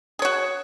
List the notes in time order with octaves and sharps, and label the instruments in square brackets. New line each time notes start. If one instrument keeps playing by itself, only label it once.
[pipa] G#4
C#5
F#4